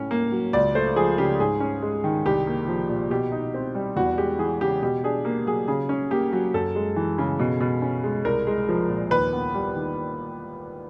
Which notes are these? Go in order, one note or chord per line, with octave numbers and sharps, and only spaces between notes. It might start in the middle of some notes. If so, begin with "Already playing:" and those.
Already playing: A2 C#4
A#3
F#3
C#2 D5
A3 C5
F3 G#4
C#3 G4
G#2 G#4
C#4
G#3
D#3
C2 G4
A#3
F3
A#2
B2 G4
D#4
C4
G3
E2 F#4
G#3 G4
E3 G#4
C#3 G4
B2 G4
D4 G#4
A#3
F#3 G#4
C#3 G#4
C#4
A#3 G4
F#3
F#2 A4
G#3
E3
C#3
B2
B2
C#4
G#3
C2 A#4
G#3
F3
A#2
D#2 B4
B3
G3
D#3